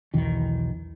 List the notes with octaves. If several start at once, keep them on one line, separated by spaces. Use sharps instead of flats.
B1 E2 D#3